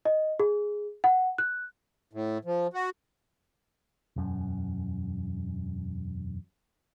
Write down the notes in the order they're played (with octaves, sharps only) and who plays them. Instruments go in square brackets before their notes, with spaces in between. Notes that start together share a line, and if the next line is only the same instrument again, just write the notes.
[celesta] D#5
G#4
F#5
F#6
[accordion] A2
F3
F#4
[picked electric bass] E1 F#2